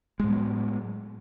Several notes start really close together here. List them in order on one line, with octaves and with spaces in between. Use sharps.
G#3 A2 B3 F#3